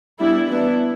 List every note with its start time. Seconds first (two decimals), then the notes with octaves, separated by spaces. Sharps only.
0.20 G3 B3 D4 E4
0.49 E3 B3 D4 E4